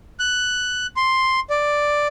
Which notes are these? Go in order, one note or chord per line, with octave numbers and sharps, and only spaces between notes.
F#6
C6
D5